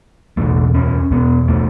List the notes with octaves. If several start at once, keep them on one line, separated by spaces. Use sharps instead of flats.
E2 B2 A3
C#4
E2 B2 B3
A3